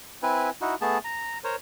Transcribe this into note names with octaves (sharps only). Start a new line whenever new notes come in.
C4 E4 B4 G#5
D#4 E4 F#4
A3 B3 G#4 A5
A#5
A#4 C5 C#5